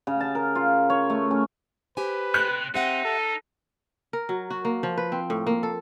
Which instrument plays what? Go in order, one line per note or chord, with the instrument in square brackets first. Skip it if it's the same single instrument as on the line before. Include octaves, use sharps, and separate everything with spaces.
[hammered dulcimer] C#3
A5
A#4
F4
C#5
A3
C#4
[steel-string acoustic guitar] G4 C5 G#5 [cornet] B4
[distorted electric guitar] C3 [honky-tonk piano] F#6
[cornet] C4 [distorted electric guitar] D#4 [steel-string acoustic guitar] G4 E5 F#5
[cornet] A4
[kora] A#4
F#3
F#4
A#3
F3
B4
C4
A2
A#3
A4